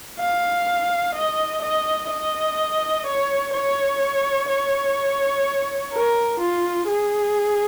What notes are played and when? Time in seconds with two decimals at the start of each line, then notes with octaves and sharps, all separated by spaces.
0.20 F5
1.15 D#5
1.62 D#5
2.10 D#5
3.06 C#5
3.53 C#5
4.49 C#5
5.93 A#4
6.40 F4
6.88 G#4